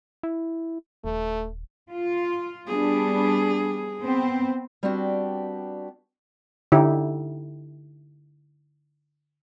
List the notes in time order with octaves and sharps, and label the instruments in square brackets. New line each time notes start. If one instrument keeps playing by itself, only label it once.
[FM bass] E4
[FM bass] D#1 [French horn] A3
[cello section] F4
[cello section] G3 B3 D4 [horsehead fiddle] G#4
[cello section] B3 C4 C5
[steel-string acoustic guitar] G3 B3 C4 D4 F#4 G4
[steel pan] D3 D#4 E4 G4